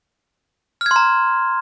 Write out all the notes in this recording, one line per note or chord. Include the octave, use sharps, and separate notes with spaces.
A#5 C6 F6 G#6